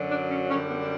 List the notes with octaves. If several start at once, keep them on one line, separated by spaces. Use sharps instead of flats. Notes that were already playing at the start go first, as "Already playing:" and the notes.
Already playing: F#2 D3 F#3
D4
C#4
F#2 D3 G3 C#4
B3
D4